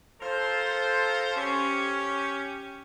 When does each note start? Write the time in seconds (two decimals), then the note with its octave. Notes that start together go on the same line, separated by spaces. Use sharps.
0.21 F4 A4 A#4 C5
1.36 C#4 G4